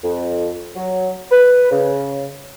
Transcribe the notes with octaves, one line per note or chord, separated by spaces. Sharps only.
F2
F#3
B4
C#3